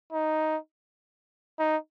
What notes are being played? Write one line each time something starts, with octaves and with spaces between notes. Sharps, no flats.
D#4
D#4